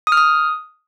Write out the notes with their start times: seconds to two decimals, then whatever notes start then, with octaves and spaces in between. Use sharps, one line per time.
0.07 D#6
0.12 F6
0.17 D#6